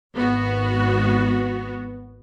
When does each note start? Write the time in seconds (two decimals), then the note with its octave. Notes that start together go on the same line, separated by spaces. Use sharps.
0.14 G#1 B3 F#4